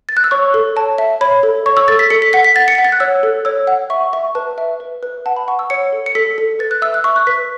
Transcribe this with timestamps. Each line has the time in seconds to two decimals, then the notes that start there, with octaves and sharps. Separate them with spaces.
0.09 A6
0.17 F#6
0.24 E6
0.31 C#5 C#6
0.54 A4
0.76 C#5 A5
0.98 E5
1.21 C#5 B5
1.43 A4
1.66 C#5 C#6
1.77 E6
1.88 A4 A6
1.99 B6
2.10 A4 C#7
2.22 B6
2.33 F#5 B6
2.44 B6
2.56 F#5 A6
2.68 C#7
2.75 F#5 B6
2.85 A6
2.92 F#6
3.00 C#5 E6
3.23 A4
3.45 C#5 E6
3.67 F#5
3.90 E5 C#6
4.13 E5 C#6
4.35 B4 A5
4.58 E5
4.80 B4
5.03 B4
5.26 F#5 A5
5.36 B5
5.48 F#5 C#6
5.59 E6
5.70 C#5 C#7
5.93 A4
6.06 C#7
6.15 A4 B6
6.38 A4
6.59 B4 A6
6.71 F#6
6.82 E5 E6
6.94 F#6
7.04 E5 C#6
7.16 F#6
7.27 B4 B6